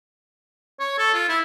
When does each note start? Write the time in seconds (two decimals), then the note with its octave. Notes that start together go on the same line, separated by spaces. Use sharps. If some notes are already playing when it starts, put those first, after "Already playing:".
0.80 C#5
0.98 A4
1.14 F4
1.29 E4